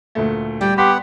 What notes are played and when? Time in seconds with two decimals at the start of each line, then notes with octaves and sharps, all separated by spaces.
0.15 D2 A#2 A3
0.61 G3 D5 G5
0.78 B3 G4 F#5 C6 B6